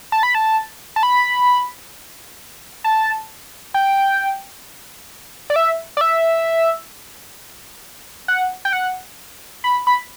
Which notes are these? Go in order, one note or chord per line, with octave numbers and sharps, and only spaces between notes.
A5
B5
A5
A5
B5
A5
G5
D5
E5
D5
E5
F#5
G5
F#5
B5
B5